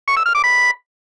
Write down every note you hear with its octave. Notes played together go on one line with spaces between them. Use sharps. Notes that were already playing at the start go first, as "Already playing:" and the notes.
C#6
E6
F6
D6
B5